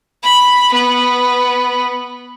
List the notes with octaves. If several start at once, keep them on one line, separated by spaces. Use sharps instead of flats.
B5
B3